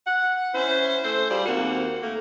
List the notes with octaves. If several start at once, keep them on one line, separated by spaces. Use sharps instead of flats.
F#5
C#4 E4 C5
A3 A4 C5
G3 F4 G#4 D5
D#2 A#3 C4 F#4
A3 A#3